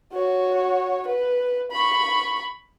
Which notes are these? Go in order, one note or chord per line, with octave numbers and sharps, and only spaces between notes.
F#4 C#5
B4
B5 C#6